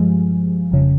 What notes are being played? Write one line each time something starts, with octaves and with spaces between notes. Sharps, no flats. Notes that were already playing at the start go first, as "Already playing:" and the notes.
Already playing: G2 F3 G#3
G1 F2 C#3